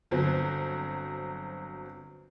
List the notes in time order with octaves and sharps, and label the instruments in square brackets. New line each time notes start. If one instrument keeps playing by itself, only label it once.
[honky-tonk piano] G1 F#3 C4